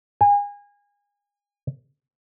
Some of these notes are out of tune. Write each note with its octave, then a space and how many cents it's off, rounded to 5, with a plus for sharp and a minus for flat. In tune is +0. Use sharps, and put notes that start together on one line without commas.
G#5 -30